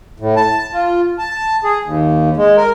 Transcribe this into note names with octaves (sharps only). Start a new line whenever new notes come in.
A2
A5
F4
A5
G#4
D#2
G#3
A#4